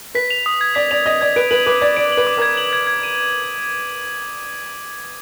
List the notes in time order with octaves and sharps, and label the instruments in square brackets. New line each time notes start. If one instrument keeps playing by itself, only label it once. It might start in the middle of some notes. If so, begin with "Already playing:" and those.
[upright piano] B4 [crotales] B6
[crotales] F7
D#6
G#6
[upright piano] D5 [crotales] B6
[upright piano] D5 [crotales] F7
[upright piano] D#5 [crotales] D#6
[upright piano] D5 [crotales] G#6
[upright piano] B4 [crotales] D7
[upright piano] B4 [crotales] F#7
[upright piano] B4 [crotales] D6
[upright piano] D5 [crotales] G#6
[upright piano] D5 [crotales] D7
[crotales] F#7
[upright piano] B4
[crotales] D6
[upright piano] A#4 [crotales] G#6
[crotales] F#7
G#6
G#6
D#7